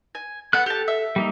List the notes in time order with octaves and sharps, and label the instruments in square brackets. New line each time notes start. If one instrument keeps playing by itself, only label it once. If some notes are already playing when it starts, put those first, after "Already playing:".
[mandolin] G#5
[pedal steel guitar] B3 F#6 [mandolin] A4 F#5
[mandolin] G4 A5 [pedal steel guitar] A4
[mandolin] E5
[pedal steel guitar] G3 A#3 D#4